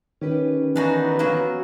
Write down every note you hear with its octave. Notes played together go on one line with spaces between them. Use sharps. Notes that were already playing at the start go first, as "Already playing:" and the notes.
D#3 C#4 G4 B4
E3 B3 D4 D#4 F#4 G#5
F#3 A#3 F#4